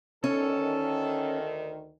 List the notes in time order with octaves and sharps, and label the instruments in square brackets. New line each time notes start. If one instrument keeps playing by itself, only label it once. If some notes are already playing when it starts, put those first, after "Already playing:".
[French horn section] D2 D#3 [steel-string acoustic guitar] C#4 [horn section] A4